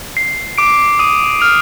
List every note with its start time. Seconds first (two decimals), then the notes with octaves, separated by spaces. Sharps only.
0.17 C7
0.58 D6 D7
0.99 D#6 D#7
1.41 F6 F7